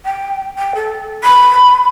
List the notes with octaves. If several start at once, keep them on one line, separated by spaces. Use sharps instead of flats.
G5
G5
A4
B5